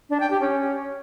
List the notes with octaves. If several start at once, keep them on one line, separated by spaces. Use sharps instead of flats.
D4
G5
G4
C#4